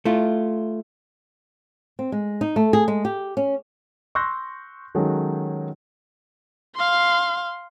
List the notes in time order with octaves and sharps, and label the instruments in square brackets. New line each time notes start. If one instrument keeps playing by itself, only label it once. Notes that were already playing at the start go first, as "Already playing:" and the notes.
[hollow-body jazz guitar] A3 E4 F4
[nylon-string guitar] C4
G#3
D#4
A3
G#4
G#3
G4
C#4
[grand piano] C6 C#6 E6 F#6 G6 A#6
D#3 F#3 G#3 C#4 G#4 A4
[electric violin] F5 C6